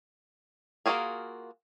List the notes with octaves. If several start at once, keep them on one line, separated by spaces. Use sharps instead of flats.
A#3 F4 F#4 G#4 A#4